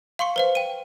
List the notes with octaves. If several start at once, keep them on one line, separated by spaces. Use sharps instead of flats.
F5 C6 C#6 C#7
B4 C5 F5
G5 D#7